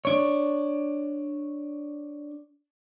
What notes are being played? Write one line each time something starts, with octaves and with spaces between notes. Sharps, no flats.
D4 C#5